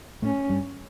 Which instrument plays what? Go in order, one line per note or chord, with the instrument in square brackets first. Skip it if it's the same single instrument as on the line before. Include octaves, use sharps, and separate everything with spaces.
[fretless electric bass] A2 A3 [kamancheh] C#4
[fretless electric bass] G2 G3